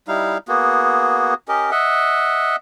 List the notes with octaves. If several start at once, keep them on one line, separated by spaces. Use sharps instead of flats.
G3 D#4 E4 F5
A#3 B3 F#4 G#4
C#4 G4 A#4 D#5
D#5 E5 F#5